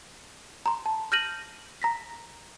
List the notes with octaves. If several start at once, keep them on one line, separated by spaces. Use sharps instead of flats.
A#5 C6
A5
F6 G6 A#6 D#7 F#7
A#5 A#6 B6